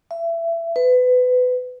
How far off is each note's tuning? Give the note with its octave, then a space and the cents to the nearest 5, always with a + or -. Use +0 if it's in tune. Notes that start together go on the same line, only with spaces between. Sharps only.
E5 +25
B4 +25